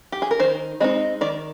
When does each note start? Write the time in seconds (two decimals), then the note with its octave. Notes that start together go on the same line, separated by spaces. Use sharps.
0.12 G4
0.22 G#4
0.31 A#4
0.40 D#3 C5
0.80 G#3 C4 D#4 D#5
1.21 D#3 D5